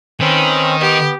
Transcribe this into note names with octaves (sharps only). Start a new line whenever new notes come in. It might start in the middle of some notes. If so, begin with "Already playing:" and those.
D#3 C4 C#4 B4
B3 G4